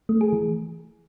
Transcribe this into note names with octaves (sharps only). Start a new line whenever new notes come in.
A3
G#4
E3